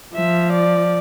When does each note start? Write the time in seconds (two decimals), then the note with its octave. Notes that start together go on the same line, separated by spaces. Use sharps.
0.15 F3 E5
0.53 D5